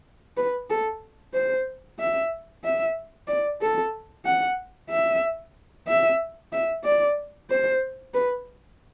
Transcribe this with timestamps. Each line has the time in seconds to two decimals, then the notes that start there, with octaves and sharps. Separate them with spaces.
0.37 B4
0.70 A4
1.34 C5
1.99 E5
2.64 E5
3.28 D5
3.61 A4
4.25 F#5
4.90 E5
5.87 E5
6.52 E5
6.84 D5
7.50 C5
8.14 B4